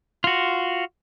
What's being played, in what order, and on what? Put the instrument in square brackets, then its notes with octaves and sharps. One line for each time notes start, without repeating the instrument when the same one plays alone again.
[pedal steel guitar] F4 F#4